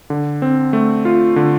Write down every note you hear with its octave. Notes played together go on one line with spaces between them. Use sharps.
D3
C4
A3
F4
D3